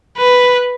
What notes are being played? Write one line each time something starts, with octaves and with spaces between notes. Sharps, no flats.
B4